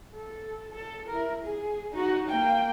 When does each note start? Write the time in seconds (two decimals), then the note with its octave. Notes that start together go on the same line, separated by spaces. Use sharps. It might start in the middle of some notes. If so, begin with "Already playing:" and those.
0.15 A4
0.72 A4
1.08 E4 A#4
1.42 G#4
1.92 D#4 F#4
2.28 A#3 G5